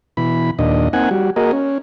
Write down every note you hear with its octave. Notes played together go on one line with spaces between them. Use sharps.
B2 E3 B5
D#2 A#2 D4 D#5
A#3 C4 D#4 F#5 G#5
G3 F#4
A#3 F#4 G#4 A#4 D#5
C#4